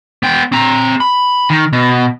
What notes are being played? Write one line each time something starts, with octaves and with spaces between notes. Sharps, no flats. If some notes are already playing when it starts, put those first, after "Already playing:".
B3 G5
C4 A#5
B5
D#3
B2